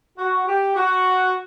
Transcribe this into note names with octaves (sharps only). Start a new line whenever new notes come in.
F#4
G4
F#4